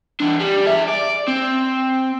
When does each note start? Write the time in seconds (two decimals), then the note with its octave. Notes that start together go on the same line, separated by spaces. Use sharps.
0.20 E3 D4
0.40 G3
0.66 G#4 E5
0.88 D5
1.27 C4